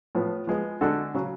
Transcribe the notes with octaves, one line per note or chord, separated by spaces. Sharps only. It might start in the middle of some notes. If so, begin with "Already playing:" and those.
A2 F3 B3
F3 G#3 B3
D3 G#3 D4 F#4 A4
C#3 F#3